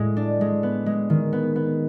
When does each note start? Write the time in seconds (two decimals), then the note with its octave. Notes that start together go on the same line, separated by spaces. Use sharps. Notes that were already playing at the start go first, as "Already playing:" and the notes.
Already playing: A2 G#3
0.17 D4
0.41 G#3
0.63 B3
0.86 G#3
1.10 D#3
1.33 B3
1.56 B3